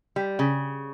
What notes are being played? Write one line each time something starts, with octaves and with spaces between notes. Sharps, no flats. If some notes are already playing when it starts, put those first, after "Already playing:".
G3
C#3